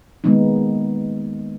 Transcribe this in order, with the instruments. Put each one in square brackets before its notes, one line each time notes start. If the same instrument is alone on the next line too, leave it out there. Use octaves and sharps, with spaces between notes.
[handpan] D#3 G#3 A#3 B3 D#4